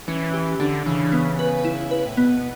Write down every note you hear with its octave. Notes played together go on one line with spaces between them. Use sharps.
E3 C#4
G4
D3 D4
C#3 E3
B3
B4
E4
B4
A2
B2 B3